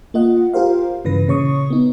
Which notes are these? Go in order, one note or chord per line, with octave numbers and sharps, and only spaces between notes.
A#3 F4 D#5 F#5
F4 G4 A#4 C5 F5
G2 C#3 E3 B4 A#6
A#2 C#3 C#5 C#6 D#6
B3 D#4